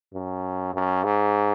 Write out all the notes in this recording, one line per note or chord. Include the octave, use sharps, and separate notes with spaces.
F#2
F#2
G#2